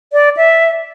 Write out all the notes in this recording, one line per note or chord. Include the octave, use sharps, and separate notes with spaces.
D5
E5